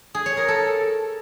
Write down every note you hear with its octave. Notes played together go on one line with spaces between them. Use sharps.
G#4
C#5
A#4
A4